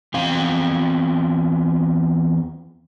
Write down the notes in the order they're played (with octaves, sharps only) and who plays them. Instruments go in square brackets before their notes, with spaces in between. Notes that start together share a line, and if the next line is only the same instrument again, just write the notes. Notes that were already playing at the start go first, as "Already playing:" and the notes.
[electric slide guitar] E2 C4 F5